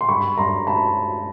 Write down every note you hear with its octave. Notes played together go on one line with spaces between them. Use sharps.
C6
G2 B5 C#6
G2 A#5 C6
A5 B5